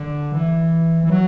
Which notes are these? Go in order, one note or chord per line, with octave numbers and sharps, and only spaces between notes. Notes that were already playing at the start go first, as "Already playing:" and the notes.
Already playing: D3
E3
E3
F#3